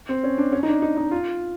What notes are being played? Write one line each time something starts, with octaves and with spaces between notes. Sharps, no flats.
C4
C#4
D4
C#4
D#4
D4
D#4
D#4
F4